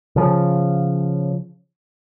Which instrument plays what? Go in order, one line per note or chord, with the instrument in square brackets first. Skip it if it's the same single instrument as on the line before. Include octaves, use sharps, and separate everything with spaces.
[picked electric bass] C#3 F3